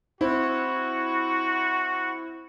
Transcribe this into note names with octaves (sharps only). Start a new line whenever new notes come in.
C4 E4 F#4